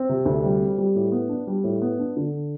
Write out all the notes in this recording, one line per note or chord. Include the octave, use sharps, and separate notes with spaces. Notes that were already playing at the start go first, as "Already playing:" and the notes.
Already playing: C4
C3
D2
G3
C4
G3
A2
B3
D4
G3
A2
B3
D4
D3